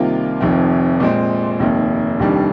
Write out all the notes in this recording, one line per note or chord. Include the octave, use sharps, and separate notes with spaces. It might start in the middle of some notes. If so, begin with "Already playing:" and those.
Already playing: C2 C3 D#3 A#3 F4
F1 F2 D#3
A#2 G#3 C4
F1 D#2 D#3
F1 D#2 D#3 G3 D4